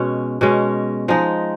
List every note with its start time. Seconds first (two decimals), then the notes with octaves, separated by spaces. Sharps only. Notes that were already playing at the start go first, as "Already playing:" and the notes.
Already playing: B2 G#3 C#4
0.41 B2 G#3 C#4
1.08 F3 G#3 D#4